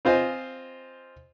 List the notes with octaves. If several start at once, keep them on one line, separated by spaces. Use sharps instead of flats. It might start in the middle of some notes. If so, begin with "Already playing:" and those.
C4 F4 C5 D#5 G#5